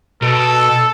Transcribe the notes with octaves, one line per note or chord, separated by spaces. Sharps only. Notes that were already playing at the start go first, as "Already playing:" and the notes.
B2 A4